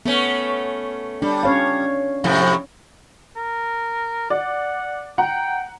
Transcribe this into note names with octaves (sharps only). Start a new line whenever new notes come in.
A3 B3 C#4
G3 D4
C#4 C#5 F5
F2 A2 C3
A#4
D5 F#5
F#5 G5 A#5